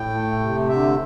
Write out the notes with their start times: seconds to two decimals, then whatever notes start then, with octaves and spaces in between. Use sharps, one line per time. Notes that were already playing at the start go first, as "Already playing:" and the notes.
Already playing: A2 G5
0.10 A3
0.38 C3
0.69 D3 E5